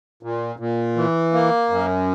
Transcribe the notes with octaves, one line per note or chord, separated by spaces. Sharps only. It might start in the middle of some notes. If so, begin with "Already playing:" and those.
A#2
A#2
E3
A#3
F#2